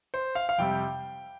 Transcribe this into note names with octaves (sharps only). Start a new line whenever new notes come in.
C5
F5
F5
F2 C3 G3 G5